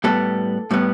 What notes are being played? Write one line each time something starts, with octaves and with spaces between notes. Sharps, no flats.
A2 G3 B3 A4
A2 G3 B3